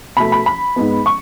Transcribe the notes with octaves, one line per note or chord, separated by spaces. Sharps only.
B2 A3 B5
B5
B5
G#2 G#3 B3
C#6